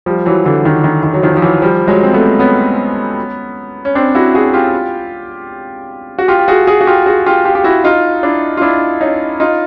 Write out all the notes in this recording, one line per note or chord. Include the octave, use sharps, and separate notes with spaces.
F3 G3
E3 F#3
D3 E3
D#3
D#3
D#3
F#3
D#3 F3
F3
E3 F#3
F3 G3
F#3 G#3
C4
A3 B3
B3 C#4
C#4
C4 D4
E4 F#4
F#4 G#4
F4 G4
F#4
F4 G4
G4
F#4 G#4
F#4 G#4
F#4
F4 G4
F#4 G#4
F4 G4
F4 G4
G4
E4 F#4
D#4 F4
D4 E4
F4
D4 E4
C#4 D#4
D#4 F4